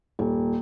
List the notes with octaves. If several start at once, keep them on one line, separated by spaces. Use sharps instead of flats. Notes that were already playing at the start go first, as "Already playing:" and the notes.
D#1